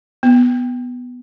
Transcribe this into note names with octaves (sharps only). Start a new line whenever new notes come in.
B3